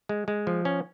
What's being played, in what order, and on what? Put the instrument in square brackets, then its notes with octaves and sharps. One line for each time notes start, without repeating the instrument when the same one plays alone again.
[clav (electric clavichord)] G#3
G#3
F3
C#4